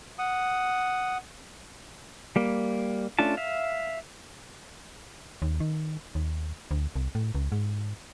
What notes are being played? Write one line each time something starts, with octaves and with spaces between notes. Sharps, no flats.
F#5 D#6
G3 A#3
A3 C#4 D4 F4 A5
E5 F5
D#2
D#3
D#2
D2
C2
A2
C#2
G#2